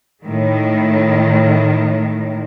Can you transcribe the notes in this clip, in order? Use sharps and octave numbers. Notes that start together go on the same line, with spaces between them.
A2 D#3